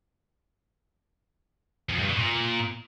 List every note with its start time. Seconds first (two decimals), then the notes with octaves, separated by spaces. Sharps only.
1.89 F2
1.99 G2
2.08 B2
2.18 A#2